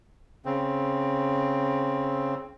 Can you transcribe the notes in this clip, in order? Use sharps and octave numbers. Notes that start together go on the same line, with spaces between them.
C#3 C4